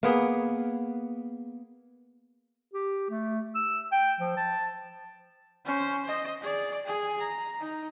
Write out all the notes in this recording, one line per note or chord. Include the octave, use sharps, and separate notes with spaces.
A#3 B3 G#4
G4
A3
E6
G5
F3
A5
C#4 C5
C5 D#5
G#4 D5
G#4
A#5
D#4